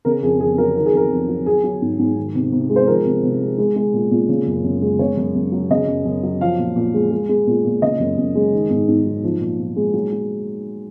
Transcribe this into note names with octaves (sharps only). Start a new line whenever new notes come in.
C#3 A#4
F2 G#4
F2 G#4
F#3 A#4
D#3 A#4
G#4
F2 A#4
F2
F#3
F#3 G#4
F#3
G#2
G#2
D#3
C3
C3
G#3
C5
F3 A#4
C3
C3
G#3
G#3
G#3
A#2
A#2
C#3
F#2
F#2
G#3
C#3 C#5
F#2
F#2
F#3
C#3 D#5
F#2
F#2
F#3
F3 F5
A#2
A#2
G#3
G#3
G#3
A#2
A#2
C#3 D#5
F#2
F#2
G#3
D#3
G#2
G#2
F#3
F3
A#2
A#2
G#3
F#3
F#3